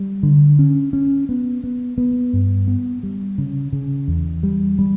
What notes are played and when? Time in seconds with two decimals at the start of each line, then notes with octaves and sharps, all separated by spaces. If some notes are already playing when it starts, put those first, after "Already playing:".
Already playing: G3
0.23 D3
0.59 C#4
0.93 C#4
1.29 B3
1.64 B3
1.98 B3
2.33 G2
2.68 B3
3.03 G3
3.38 C#3
3.73 C#3
4.08 E2
4.43 G3
4.79 G3